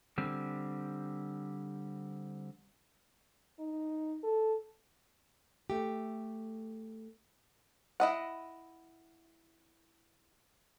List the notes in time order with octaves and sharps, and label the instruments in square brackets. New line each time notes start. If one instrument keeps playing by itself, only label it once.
[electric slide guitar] D3 G3 C4
[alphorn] D#4
A4
[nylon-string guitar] A3 G4
[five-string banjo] E4 D#5 F#5